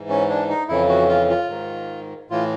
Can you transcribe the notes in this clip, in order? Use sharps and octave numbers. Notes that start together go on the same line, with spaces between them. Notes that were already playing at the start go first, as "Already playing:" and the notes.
Already playing: G#2 E3
C#4
D4
D#4
F2 C#3 E3 E4
F#4
F4
F4
G#2 D#3
A2 E3 F4